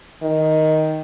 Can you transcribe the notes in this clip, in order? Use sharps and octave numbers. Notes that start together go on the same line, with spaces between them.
D#3